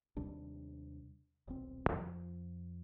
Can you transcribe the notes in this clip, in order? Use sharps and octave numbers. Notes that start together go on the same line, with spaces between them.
D#2 C3 G3 D4
D#1 B1 C4
F2 F3